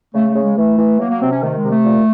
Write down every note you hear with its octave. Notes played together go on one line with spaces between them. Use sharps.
C#3 A3
A3
C#3
G#3
E3 A3
E3
F#3 A#3
A#3
C3 C4
C#4
D#3 A3
G#3
C3
A3
A#2